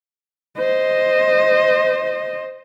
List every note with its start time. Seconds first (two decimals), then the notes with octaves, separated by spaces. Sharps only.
0.57 C5 D#5